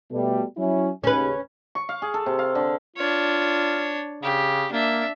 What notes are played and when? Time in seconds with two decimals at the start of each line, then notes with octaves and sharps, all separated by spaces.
0.11 B2 G3 A3
0.57 F#3 C#4 E4
1.04 D#2 C#3 C#4 B4
1.75 C#6
1.89 F5
2.02 G#4
2.14 A4
2.26 C3
2.39 F5
2.55 D3
2.96 D4 F4 C#5
4.23 C#3 G4
4.72 A#3 D4 E5